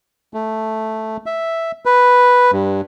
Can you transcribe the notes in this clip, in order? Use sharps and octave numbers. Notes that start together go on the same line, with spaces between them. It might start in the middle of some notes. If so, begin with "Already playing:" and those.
A3
E5
B4
G2